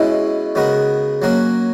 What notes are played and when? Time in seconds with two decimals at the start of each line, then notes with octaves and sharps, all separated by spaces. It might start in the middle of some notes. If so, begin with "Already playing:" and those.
Already playing: B2 G#3 C#4 E4
0.55 C#3 G#3 B3 F#4 A#4
1.22 F#3 A#3 C#4 F#4 A#4